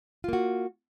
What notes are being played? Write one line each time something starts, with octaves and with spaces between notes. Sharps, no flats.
A#3 F4 F#4